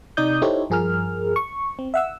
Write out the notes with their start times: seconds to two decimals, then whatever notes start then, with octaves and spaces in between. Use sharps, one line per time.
0.17 C3 D#4 D5 D#6 G6
0.42 D#4 E4 G4 A4 C5 C#5
0.70 G2 F3 G#4 A#4 F6
1.36 C#6
1.79 C4
1.94 E5 F#5 E6